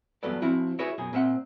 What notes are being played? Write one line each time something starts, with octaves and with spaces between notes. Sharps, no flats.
E2 G2 F#3 B3 A4 D5
F3 C4 E4 F#4
E4 F#4 G#4 B4 C#5 E5
F#2 B2 G#4
A#2 C4 E5 F#5